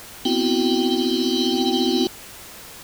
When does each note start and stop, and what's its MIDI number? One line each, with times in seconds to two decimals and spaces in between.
0.25 2.07 59
0.25 2.07 60
0.25 2.07 64
0.25 2.07 66
0.25 2.07 79